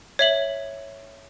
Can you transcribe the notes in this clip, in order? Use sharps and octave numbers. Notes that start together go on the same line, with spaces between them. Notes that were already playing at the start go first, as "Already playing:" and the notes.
C#5 E5 F#7